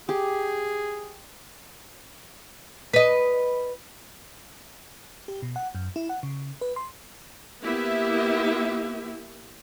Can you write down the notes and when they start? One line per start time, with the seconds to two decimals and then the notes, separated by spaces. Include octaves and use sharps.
0.09 G4 G#4
2.93 B4 D#5
5.28 G4
5.42 B2
5.56 F#5
5.75 F#2
5.96 E4
6.09 F#5
6.23 C#3
6.61 B4
6.76 C6
7.64 A#3 B3 E4 G4 E5